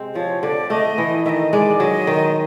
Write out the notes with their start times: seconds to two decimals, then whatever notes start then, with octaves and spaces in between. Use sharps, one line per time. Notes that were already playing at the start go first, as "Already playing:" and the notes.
Already playing: C3 G#3 C4
0.15 F3 C#5
0.42 D3 D5
0.70 A3 D#5
0.98 E3
1.25 D#3 D#5 E5
1.53 G#3 D5
1.79 F#3 D#5
2.07 D#3